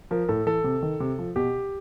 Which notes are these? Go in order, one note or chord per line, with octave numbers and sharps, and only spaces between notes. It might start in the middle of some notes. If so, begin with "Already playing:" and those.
F3 A#4
A2 A4
E3 A4
C3
D#3
C3
F3
B2 G4